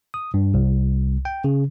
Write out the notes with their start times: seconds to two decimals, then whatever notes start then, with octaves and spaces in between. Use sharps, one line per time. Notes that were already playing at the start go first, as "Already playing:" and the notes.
0.14 D#6
0.34 G2
0.54 C2
1.25 G5
1.44 C#3